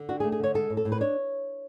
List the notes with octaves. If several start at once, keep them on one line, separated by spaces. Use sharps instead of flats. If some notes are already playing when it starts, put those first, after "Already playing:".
Already playing: D3
D4 F#4
G#4
A3
G#4
D3 C#5
G#3 A4
A2
A4
A2
B4
D4 C#5